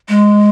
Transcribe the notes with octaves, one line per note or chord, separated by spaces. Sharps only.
G#3